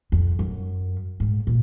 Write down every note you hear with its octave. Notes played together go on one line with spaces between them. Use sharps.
F2
F#2
G#2
A#2